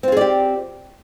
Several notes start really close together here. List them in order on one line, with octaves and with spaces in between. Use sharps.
C4 F4 G#4 D5 G4